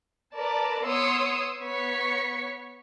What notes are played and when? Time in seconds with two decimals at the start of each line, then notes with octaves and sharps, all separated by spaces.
0.33 A#4 B4 D5 A5
0.85 B3 C#5 C6 D#6 E6 C#7
1.62 B3 C#5 C#6 B6 C#7